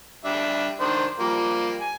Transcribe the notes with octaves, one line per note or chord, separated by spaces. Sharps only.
G3 D4 E5
D#3 D4 C5
F3 G3 A#3
G#5